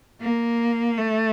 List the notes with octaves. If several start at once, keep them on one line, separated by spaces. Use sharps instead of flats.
A#3
A3